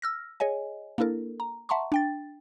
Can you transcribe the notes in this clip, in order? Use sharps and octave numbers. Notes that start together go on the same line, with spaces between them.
E6 F6 A#6
G#4 C#5 D#5 G#5
A#3 D4 E4 A4 A#4
A#5
E5 F#5 A5 A#5 C6 C#6
D4 G5 A6